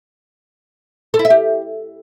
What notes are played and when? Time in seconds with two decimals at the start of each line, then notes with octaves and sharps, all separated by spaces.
1.14 A4
1.19 E4
1.25 E5
1.30 G4